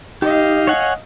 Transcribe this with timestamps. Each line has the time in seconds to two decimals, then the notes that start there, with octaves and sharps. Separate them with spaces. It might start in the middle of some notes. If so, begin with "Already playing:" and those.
0.22 D#4 G4 D#5 F5
0.67 C#5 F#5 G#5